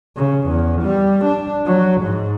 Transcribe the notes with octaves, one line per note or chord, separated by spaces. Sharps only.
C#3
E2
G3
D4
F#3
G#2